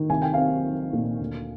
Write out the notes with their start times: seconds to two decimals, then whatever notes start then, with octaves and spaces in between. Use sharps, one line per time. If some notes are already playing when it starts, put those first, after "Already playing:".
Already playing: D#3
0.09 C2 G#5
0.22 G5
0.33 C4 F5 G#5
0.65 F3
0.93 A#2
1.20 D2